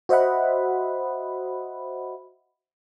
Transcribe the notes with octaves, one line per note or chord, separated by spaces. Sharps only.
F#4 C5 D#5 E5 F#5 B5